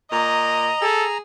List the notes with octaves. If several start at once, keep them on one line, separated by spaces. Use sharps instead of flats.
A#2 D#5 A#5
G#4 A4